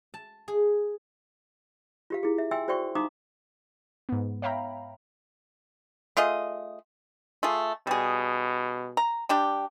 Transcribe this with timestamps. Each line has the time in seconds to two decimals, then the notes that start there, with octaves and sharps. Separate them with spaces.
0.14 A5
0.48 G#4
2.10 F4 G4 F5
2.23 E4 G#4
2.38 E5
2.51 E5 G5 G#5 C6 E6
2.68 F#4 C5 D5 G5 C6 C#6
2.95 D#4 F5 A#5 C6 D6 D#6
4.09 G#2 B3
4.42 C#5 E5 F5 G5 A#5 B5
6.17 A3 F4 G#4 D#5
7.43 A3 F4 G#4
7.87 B2 G3 G#4
8.97 A#5
9.29 G3 D4 G4